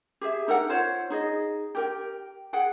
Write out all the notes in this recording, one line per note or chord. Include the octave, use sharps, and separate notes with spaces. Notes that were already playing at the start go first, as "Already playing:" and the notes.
G4 G#4 E5
D#4 A4 A#4 F#5
F4 C5 C#5 F#5
D#4 G#4 D#5
G4 A#4 G5
G#4 F#5 G5